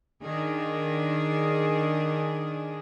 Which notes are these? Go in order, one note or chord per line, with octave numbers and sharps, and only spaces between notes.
D#3 D4 G#4